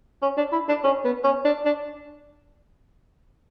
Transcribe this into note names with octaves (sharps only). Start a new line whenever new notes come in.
C#4
D4
E4
D4
C#4
B3
C#4
D4
D4